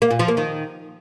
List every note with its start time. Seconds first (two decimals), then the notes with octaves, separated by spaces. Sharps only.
0.02 A#3
0.11 A#2
0.19 F3
0.28 A#3
0.37 D#3